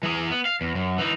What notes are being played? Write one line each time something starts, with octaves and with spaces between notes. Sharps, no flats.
E3 G#4
B3
F5
E2
F#2
E3 D#4